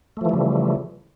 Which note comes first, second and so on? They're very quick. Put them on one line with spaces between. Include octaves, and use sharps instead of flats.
A3 F3 E3 G3 C#3